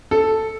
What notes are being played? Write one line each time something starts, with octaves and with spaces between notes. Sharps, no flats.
A4